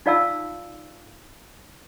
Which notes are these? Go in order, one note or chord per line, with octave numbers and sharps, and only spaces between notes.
D#4 F4 D5 F5 A5 E6